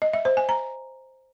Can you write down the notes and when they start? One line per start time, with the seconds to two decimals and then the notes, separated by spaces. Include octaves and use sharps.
0.02 D#5
0.13 E5
0.25 C5
0.37 G#5
0.49 A#5